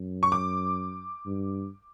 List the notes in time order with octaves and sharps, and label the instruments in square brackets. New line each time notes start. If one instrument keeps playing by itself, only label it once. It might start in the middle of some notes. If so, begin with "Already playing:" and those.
Already playing: [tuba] F#2
[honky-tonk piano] C#6
D6
[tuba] G2